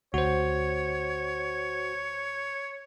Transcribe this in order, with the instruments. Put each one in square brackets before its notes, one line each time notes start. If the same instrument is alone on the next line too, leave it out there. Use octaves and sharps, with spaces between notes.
[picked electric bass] D2 [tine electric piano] F#4 C5 [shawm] C#5